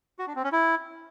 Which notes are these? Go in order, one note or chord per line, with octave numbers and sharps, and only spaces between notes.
F#4
D4
C4
C#4
E4